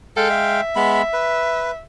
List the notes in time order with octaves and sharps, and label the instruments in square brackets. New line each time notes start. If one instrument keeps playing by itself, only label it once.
[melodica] G#3 F5 G5 [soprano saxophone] A4
[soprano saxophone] E5
[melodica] G#3 B3 B5
B4